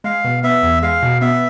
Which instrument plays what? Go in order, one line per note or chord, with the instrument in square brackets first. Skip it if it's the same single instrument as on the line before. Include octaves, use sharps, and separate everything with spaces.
[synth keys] G#3 [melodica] F5
[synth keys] B2
[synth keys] B3 [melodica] E5
[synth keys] E2
[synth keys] G#3 [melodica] F5
[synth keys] B2
[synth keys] B3 [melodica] E5